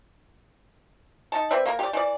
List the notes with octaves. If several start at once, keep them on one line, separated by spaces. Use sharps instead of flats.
D#4 A5
C4 B4 D5 E5
A#3 A#4
G4 D5
E3 D5